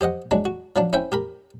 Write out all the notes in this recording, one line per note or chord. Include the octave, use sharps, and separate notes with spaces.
G4 C5 D#5 F#5
F#3 G#3 D4
F#4
F3 F#3 D4
C#4 E4 C5 E5 G5
G4 A#4 B5